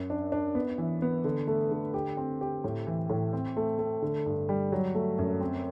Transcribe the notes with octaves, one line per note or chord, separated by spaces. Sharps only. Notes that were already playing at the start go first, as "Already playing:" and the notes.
Already playing: F#2
D4
D4
B3
E3
B3
D3
A3
D3
G4
C4
G4
A2
E3
A2
C4
A3
A3
D3
G2
G3
F#3
A3
F#2
C4